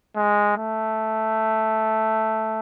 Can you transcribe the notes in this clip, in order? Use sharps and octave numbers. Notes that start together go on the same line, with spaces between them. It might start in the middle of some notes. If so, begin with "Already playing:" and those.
G#3
A3